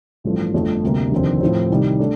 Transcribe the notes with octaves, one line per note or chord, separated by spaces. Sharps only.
A1 G2 F3 A3
G1 F2 D3 F3 A3
D2 C3 G3 A#3
F1 D#2 D3 F3 C4
A2 F3 C4
C2 C3 D#3 G3
A3 D4